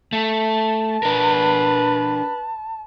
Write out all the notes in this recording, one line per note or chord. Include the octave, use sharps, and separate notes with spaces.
A3 A5
D4 A#4 B4